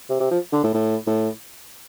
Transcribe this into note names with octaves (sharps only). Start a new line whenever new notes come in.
C3
C3
F3
D3
A2
A2
A2